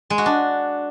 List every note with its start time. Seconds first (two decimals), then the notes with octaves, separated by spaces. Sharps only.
0.10 G#3
0.18 F#4
0.26 D4